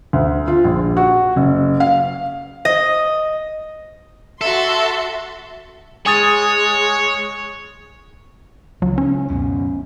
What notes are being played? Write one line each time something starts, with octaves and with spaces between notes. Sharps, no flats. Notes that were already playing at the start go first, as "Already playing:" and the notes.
D2
F4
A#1
F#4
F#1
F5
D#5
F#4 A4 E5 C6
G#3 C#5 G#5 D#6 A6
C#2 F#3
C#4
F#2 B2